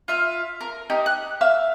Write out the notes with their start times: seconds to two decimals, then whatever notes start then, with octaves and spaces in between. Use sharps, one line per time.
0.08 F4 E5 F5
0.61 A#4
0.90 D#4 G4 A#4
1.06 F#6
1.41 E5 F5 E6